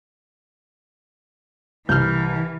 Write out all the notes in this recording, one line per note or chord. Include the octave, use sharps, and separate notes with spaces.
C2 E3 F6 G6